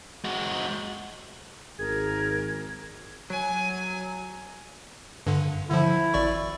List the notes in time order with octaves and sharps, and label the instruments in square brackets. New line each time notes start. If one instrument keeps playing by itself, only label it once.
[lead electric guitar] G#3 F#4
[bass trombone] G#1 [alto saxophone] G#4 [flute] A#4 [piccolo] G#6
[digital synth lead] F#3 [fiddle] G#5
[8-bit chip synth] G2 D3
[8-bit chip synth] D3 F3 [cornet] E4
[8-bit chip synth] G#1 D5 C#6